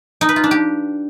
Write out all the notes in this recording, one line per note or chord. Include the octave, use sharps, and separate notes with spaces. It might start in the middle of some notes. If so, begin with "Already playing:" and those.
D#4
B4
F4
D4
G4